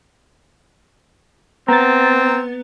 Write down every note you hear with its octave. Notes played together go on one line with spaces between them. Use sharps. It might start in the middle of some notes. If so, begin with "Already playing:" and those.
B3 C4 A#5 A6